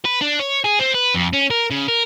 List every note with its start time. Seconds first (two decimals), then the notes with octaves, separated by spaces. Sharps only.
0.05 B4
0.21 D4
0.39 C#5
0.64 G#4
0.79 C4
0.94 B4
1.14 F2
1.33 C#4
1.50 A#4
1.70 C#3
1.88 A#4